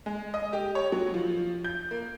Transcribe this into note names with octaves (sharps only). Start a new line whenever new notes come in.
G#3
D#5
G4
C#5
F#3
F3
G6
A#3